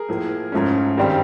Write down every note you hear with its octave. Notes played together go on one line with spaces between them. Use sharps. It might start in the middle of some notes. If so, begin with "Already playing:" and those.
Already playing: G#4 A#4
A2 F3 A#3
G#2 F3 A3 C#4
G2 D#3 G3 C4